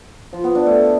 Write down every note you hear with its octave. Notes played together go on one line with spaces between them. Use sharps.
F3
B3
D4
A3